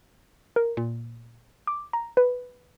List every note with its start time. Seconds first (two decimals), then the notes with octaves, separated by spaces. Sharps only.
0.56 A#4
0.77 A#2
1.67 D6
1.93 A#5
2.17 B4